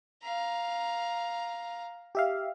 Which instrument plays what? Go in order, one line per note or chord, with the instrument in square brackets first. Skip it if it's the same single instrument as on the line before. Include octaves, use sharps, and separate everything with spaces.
[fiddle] F5 A#5
[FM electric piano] G4 E5 F5